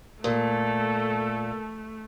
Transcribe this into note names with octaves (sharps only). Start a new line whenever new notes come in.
A#2 A3 A4 A#4